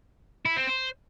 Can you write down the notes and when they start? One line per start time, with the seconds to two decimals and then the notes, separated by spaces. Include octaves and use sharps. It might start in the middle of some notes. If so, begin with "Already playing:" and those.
0.45 E4
0.56 C4
0.67 C5